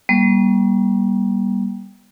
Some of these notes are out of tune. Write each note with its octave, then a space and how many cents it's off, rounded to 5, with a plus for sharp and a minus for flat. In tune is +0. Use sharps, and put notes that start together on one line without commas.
G3 +0 A#3 +45